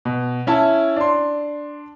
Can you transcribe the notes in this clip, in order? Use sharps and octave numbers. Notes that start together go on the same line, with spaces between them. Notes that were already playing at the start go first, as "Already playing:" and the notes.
B2
C#4 E4 E5 A5
D4 C6